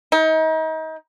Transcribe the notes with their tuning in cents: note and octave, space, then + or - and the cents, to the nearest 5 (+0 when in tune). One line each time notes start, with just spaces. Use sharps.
D#4 +35